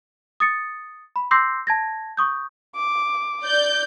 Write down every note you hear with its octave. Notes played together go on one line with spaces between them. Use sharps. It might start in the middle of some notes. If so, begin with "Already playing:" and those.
D#6 A6 C#7
B5
C6 D6 E6 G6 A#6 C7
A5 G#6 A#6
C#6 D#6 G6
D6
D5 G6